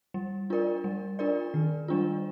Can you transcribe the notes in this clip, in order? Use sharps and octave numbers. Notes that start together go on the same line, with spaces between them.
G3
D4 F4 A#4 D5
G3
D4 F4 A#4 D5
D#3
G3 D4 F4